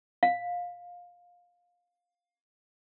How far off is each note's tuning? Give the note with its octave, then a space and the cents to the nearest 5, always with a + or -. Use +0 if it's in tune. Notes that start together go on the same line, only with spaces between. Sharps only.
F5 +20